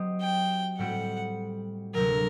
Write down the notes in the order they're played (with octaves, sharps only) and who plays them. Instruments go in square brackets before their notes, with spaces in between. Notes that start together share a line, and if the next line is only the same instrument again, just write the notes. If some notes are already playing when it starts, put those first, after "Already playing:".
Already playing: [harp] F#3 C4 G4 C5 D#5
[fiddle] G5
[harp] A2 G3 C4 F#4 [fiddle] F#5
[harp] D2 C3 F#3 [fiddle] A#4